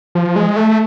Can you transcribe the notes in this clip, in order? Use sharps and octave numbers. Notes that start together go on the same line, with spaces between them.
F3
G#3
A3